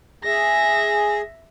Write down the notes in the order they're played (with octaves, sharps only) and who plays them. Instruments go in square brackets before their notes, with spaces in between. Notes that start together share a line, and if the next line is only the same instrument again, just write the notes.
[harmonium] G#4 [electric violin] E5 A#6